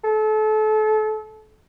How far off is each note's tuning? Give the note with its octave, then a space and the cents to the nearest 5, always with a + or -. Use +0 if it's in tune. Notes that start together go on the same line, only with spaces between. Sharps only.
A4 -30